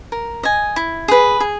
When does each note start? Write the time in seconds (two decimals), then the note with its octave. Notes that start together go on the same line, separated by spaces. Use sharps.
0.12 A#4
0.43 D#5 G#5
0.76 E4
1.08 G#4 B4
1.40 G#4